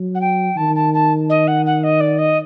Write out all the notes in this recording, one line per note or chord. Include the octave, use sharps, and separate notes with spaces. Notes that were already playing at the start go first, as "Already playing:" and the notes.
Already playing: F#3
F#5
G5
D#3 A5
A5
A5
D#5
F#5
F#5
D#5
D5
D#5